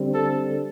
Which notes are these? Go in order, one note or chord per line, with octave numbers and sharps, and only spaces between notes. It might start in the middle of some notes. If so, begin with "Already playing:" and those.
Already playing: D3 G3 C4
A4